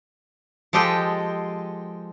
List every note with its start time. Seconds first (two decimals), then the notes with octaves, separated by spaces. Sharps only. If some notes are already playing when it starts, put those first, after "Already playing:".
0.73 F3 G#3 G4 A4 D#5 G5